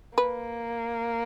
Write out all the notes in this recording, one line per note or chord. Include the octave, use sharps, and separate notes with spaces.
A#3 B4